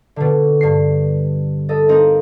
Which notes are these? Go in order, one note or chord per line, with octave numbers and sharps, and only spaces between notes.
B2 D3
G2 C7
A4 D#5
A#3 C4 D#4 D#5